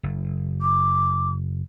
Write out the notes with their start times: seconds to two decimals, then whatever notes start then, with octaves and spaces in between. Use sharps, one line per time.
0.03 F#1
0.62 D6